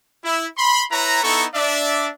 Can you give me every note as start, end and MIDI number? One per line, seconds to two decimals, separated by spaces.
0.24 0.46 64
0.58 0.84 83
0.58 0.84 84
0.91 1.21 64
0.91 1.21 71
0.91 1.21 73
0.91 1.21 82
1.23 1.45 59
1.23 1.45 63
1.23 1.45 64
1.23 1.45 69
1.23 1.45 82
1.23 1.45 85
1.55 2.09 62
1.55 2.09 74
1.55 2.09 76